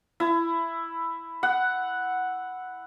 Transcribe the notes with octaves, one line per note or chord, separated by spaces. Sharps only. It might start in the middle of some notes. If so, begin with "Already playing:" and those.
E4
F#5